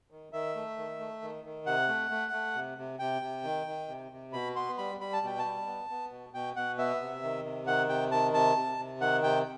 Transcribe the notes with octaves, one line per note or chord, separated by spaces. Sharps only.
D#3
D#3 E5
A3
D#3
A3
D#3
D#3
C3 F#5
A3
A3
A3
C3
C3
C3 G5
C3
D#3
D#3
C3
C3
B2 B5
B3 C6
G3 B5
G3 B5
A5
B2 G5
A5
G3
B3
B3
B2
B2 G5
B2 F#5
B3 E5
C3
D#3
C3
D#3 F#5
C3 G5
D#3 A5
C3 A5
C3
C3
D#3 F#5
C3 G5